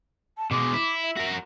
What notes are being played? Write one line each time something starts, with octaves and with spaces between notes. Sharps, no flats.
A5
B2 G#3 D6
E4
E5
F#4 A#4